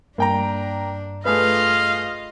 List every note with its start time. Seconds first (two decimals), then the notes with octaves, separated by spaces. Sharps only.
0.18 G2 A#3 D4 G5 A#5
1.25 A3 F4 G#4 B4 D#5 F5